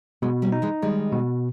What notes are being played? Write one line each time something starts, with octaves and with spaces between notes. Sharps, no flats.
B2 G#3 B3
G3 A#3
D#4
E3 G#3
D#3 G3 G#3
B2